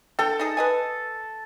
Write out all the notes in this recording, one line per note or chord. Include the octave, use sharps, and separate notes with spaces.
D3 A4 G5
D#4 G#4 D#5
B4 D#5 G#5